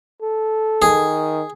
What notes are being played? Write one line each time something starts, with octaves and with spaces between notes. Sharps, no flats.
A4
D#3 G#4